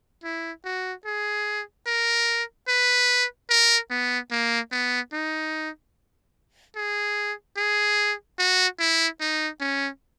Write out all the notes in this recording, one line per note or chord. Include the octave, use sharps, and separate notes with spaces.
E4
F#4
G#4
A#4
B4
A#4
B3
A#3
B3
D#4
G#4
G#4
F#4
E4
D#4
C#4